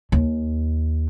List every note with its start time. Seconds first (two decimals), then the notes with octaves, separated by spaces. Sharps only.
0.12 D#2